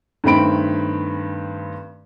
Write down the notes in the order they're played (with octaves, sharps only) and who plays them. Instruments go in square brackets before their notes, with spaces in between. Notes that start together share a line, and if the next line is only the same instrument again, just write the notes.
[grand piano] G2 D#3 A3 C4 B5 D7